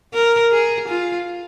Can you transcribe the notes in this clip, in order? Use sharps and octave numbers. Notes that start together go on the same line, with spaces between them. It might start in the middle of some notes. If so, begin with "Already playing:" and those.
A#4
G#4
F4